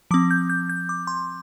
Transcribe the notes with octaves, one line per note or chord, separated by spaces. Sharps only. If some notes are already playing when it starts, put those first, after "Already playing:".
F3 C4 D6
G6
G6
G6
D6
C6